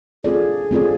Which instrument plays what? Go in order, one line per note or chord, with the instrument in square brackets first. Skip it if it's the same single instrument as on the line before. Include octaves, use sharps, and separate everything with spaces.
[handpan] A3 C4 F4 A4 D5 [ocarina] G#4
[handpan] A3 C4 F4 A4 D5